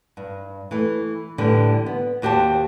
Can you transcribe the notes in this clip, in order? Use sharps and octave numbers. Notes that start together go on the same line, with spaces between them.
G2
E3 A3
A2 D3 E3 G3
B3
D#2 F#4 G4 C5 A5